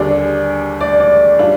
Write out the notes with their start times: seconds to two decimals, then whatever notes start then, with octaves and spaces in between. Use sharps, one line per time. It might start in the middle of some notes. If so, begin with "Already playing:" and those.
Already playing: D#2 D3 G3 D4 G#4 D5
0.80 D5
1.00 D5
1.39 G3 D4 F4